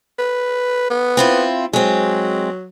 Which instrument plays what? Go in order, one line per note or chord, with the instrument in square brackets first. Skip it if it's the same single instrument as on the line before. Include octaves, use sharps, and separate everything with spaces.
[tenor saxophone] B4
B3
[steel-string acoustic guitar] C4 E4 F4
[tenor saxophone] F#3 [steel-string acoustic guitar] G#3 C4